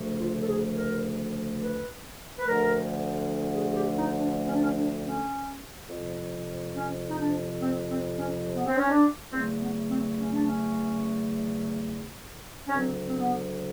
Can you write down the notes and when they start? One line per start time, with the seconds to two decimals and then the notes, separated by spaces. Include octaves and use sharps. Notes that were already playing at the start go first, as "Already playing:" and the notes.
Already playing: D2 C#3 F3 A3
0.18 F4
0.39 A4
0.46 G#4
0.75 A#4
1.61 B4
2.39 B4
2.46 D2 D3 F3 A3 A#4
3.54 G#4
3.70 G#4
3.75 G4
3.96 D#4
4.17 D4
4.46 C#4
4.53 D4
4.62 C#4
4.74 D4
5.03 C#4
5.89 F2 C3 F3
6.75 C#4
7.10 D#4
7.17 D4
7.60 C4
7.89 C4
8.17 C#4
8.55 B3
8.66 C4
8.77 C#4
8.88 D4
9.31 E2 C#3 F#3 A3 C4
9.59 B3
9.88 C4
10.17 C#4
10.30 D4
10.44 C#4
12.67 C#4
12.74 D2 C#3 F#3 C4
13.06 C4
13.17 B3